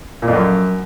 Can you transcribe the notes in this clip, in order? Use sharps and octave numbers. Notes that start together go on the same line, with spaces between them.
A#2
F2
F#2